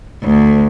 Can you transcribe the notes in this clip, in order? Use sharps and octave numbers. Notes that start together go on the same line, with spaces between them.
D2